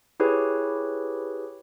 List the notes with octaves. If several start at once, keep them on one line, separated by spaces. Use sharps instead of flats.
E4 G4 G#4 B4 C#5